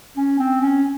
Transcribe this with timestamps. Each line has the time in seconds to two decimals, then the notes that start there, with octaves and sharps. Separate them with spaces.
0.17 C#4
0.39 C4
0.61 C#4